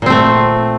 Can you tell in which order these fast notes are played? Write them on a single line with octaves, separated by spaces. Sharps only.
A#2 C4 A3